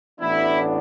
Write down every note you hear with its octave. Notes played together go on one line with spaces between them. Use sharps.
A1 A2 E3 B3 D4 E4